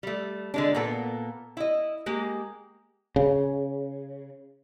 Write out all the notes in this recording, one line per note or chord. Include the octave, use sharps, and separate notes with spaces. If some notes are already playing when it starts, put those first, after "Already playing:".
G3 A3
D3 G#3 D4
A#2 A#3 B3 A4
E4 D#5
G#3 A#3 G4
C#3